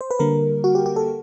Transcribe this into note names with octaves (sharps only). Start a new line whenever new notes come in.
C5
B4
D3 G3 A#3 A#4
F#4
G4
G4
A4